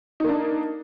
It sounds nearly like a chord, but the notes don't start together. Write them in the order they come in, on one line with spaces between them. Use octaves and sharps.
D#4 A#3 D4